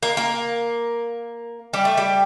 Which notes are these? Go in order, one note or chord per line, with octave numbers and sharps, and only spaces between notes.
A#3
A#3
G3
A3
G3